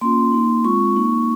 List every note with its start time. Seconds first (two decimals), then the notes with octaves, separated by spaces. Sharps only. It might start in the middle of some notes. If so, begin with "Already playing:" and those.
0.01 A#3 C#4 F4 C6
0.32 A#3 D#4
0.64 G#3 C4 F4 C#6
0.96 A#3 D#4